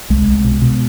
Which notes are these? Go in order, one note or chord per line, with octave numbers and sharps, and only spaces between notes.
C2 G#3
C2
B2
B2